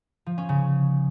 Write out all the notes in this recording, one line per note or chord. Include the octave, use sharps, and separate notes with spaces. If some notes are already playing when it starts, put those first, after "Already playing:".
F3
C#4
C#3